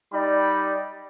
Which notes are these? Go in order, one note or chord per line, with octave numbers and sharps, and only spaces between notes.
G3 D#4 D5 B5